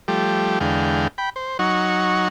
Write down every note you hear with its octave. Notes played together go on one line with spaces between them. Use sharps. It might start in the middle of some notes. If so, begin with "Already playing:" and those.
F3 G3 A3 G4
E2 D3 G#3 F5 G5
G5 B5
C5
F#3 D#4 F#5 C#6